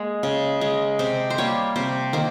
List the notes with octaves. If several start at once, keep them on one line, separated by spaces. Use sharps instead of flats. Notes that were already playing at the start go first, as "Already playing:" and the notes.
Already playing: G#3 A#3
C#3
G#3
C3 C5
C5
G3 A#3 C#5
C3 C5
D#3 A#3 C5